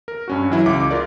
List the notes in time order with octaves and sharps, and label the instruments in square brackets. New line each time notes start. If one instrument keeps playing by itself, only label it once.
[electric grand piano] A#4
G2 C#4 F#4
E3 F#3 E4
C#2 D6
F4 A#4 D5